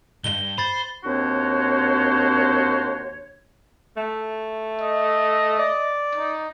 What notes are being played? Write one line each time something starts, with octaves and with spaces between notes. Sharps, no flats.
B1 G2 G7
C5 B5 A6
D#2 C4 D4 F#4 C5 C#5
A3
D#5
D5
D#4